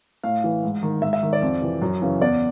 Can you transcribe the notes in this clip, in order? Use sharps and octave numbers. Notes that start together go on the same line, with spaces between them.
A2 F5
E3
G#2
D#3
G#2 E5
E5
D#3
D5
F2
C3 E3
F#2
C#3 E3
E2 D5